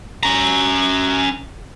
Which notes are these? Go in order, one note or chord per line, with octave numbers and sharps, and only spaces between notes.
C#4 A#5